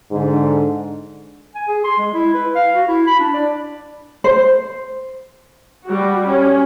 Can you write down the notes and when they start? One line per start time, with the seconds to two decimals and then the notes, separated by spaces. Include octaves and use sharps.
0.12 G#2 D3
1.55 G#5
1.68 G#4
1.84 C6
1.98 G#3
2.14 E4
2.34 B4
2.55 F5
2.75 F#4
2.88 E4
3.07 B5
3.20 D4
3.34 D5
4.24 C5
5.85 G3 F#4
6.26 C#4